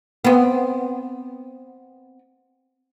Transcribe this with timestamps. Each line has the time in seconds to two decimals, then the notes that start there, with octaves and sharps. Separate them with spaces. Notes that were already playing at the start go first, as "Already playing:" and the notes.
0.24 B3 C4